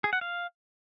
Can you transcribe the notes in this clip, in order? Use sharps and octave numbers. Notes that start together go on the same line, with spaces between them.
G#4
F#5
F5